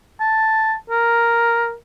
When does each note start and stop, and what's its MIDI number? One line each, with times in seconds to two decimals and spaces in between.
0.21 0.74 81
0.90 1.74 70